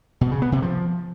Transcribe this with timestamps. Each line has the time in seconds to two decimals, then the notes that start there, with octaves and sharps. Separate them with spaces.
0.21 B2
0.31 C#3
0.42 B3
0.52 C3
0.62 F3